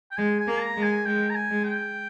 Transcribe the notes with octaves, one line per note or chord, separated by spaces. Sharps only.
G5
G#3 G#5
G#5
A#3
A#5
G#3
G#5
G#3 G5
A#5
G#5
G#3
G5